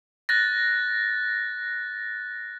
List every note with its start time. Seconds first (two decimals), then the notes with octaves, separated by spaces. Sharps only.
0.29 F#6 A6 A#6